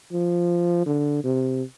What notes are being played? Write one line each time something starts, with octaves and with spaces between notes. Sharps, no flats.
F3
D3
C3